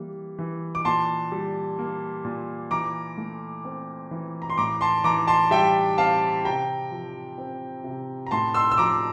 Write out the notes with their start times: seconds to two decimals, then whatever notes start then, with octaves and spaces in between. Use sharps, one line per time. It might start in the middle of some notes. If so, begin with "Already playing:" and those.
Already playing: E3 G3 A#3
0.39 E3
0.75 D6
0.85 A#2 A5 C6
1.32 G3
1.79 A#3
2.25 A#2
2.71 E3 A#5 D6
3.17 A3
3.65 C4
4.11 E3
4.42 A#5
4.50 C6
4.58 A2 A#5 D6
4.81 A5 C6
5.04 E3 A#5 D6
5.28 A5 C6
5.51 G3 E5 G5
5.98 C4 F5 A5
6.45 C3 G5 A#5
6.91 F3
7.38 C4
7.84 C3
8.27 A#5
8.31 A2 A5 C6
8.54 C6 E6
8.71 E6
8.78 F3 A#5 D6